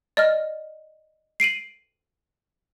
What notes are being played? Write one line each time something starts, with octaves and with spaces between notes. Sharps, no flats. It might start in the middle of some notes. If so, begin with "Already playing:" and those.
D5 D#5 F6
C7 D7 D#7 F#7